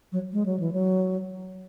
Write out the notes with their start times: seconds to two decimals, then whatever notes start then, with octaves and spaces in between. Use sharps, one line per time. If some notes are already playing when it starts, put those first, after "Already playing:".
0.12 F#3
0.33 G#3
0.46 F#3
0.60 E3
0.73 F#3